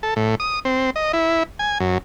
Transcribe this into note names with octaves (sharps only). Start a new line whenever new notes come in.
A4
A2
D#6
C4
D#5
E4
G#5
F#2